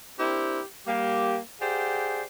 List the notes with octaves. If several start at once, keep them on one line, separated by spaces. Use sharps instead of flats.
C4 D4 E4 G4 A#4 C5
G3 A#3 G4
G4 G#4 C5 D5 F5 F#5